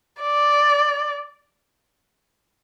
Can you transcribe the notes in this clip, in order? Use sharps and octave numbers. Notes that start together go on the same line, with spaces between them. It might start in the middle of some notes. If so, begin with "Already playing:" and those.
D5